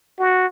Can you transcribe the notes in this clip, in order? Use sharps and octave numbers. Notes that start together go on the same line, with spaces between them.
F#4